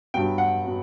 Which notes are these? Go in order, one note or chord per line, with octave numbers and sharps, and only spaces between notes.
G2 F#3 B3 G5
F#5
F#3 B3